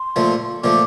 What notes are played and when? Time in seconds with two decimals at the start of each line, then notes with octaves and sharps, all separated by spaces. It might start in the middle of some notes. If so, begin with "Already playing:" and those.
Already playing: C6
0.16 A#2 F3 A3
0.63 A#2 F3 A3 D6